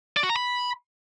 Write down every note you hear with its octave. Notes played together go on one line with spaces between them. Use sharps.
D5
F#4
A#5
B5